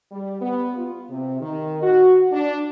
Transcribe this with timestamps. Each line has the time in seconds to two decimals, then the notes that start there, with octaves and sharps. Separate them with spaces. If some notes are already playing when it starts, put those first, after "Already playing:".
0.12 G3
0.41 B3
0.76 F4
1.10 C3
1.41 D#3
1.83 F#4
2.32 D4